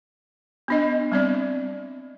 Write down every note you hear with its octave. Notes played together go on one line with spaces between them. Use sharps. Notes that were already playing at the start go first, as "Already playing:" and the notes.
B3 D4 D#5
G3 C4 D5